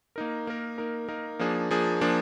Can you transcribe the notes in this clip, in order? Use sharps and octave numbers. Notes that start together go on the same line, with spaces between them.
A#3 D#4 A#4
A#3 D#4 A#4
A#3 D#4 A#4
A#3 D#4 A#4
F3 A#3 D4 G#4
F3 A#3 D4 G#4
F3 A#3 D4 G#4